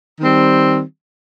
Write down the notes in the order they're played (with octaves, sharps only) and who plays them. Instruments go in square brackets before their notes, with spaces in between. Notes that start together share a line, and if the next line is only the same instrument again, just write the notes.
[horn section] D#3 G3 C4